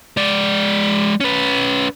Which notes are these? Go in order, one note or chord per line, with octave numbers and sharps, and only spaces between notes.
G#3 D5
C#4 B4